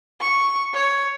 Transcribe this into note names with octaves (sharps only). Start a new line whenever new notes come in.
C#6
C#5